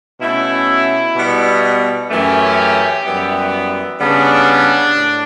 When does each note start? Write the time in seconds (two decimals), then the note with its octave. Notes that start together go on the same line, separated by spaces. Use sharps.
0.21 B2 A3 C#4 E4
1.16 B2 G3 B3
2.10 F#2 E3 A3 C#4 G4
3.05 F#2 E3 G3 B3
4.00 C#3 G3 B3 D4
4.95 A2